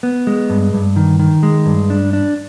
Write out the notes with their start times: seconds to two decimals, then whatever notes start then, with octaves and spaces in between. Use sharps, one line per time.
0.03 B3
0.27 G#3
0.50 G2
0.74 G2
0.96 D#3
1.19 D#3
1.43 G#3
1.66 G2
1.90 D4
2.13 D4